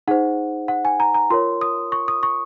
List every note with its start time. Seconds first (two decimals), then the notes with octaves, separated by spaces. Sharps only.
0.08 D#4 G#4 C5 F#5
0.68 F#5
0.85 G#5
1.00 A#5
1.14 A#5
1.30 F4 A#4 C#5 C6
1.61 D#6
1.92 C#6
2.08 D#6
2.23 C#6